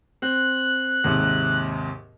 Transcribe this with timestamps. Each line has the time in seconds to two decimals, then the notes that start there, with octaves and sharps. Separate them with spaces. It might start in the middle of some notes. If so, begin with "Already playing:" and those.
0.22 C4 F#6
1.04 D#2 G#2 C3